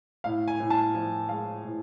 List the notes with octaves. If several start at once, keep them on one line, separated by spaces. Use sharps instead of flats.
A2 F5
G#5
A2
A5
F3 G#5
G#3 F5
A2